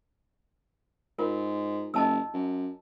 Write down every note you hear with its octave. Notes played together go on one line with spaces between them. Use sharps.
G#2 F4 A#4
F#1 D#5 A5 E6
F#2